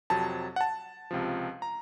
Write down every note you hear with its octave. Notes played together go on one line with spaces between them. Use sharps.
F2 C3 F#3 A5
F#5
A5
C#2 C3 F3
A#5